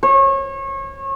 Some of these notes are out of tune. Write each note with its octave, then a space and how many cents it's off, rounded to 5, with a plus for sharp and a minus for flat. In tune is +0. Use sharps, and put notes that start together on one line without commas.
C#5 -30